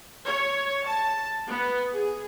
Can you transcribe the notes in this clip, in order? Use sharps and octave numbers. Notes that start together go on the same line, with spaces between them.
C#5
A5
B3
G#4